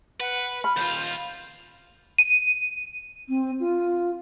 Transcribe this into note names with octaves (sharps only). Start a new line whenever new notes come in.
B4 F#5
B5 F6
D#2 F4 G6
D#7
C4
F4